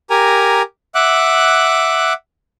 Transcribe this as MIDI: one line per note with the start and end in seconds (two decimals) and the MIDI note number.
0.10 0.62 67
0.10 0.62 70
0.10 0.62 80
0.10 0.62 82
0.95 2.13 76
0.95 2.13 78
0.95 2.13 86
0.95 2.13 90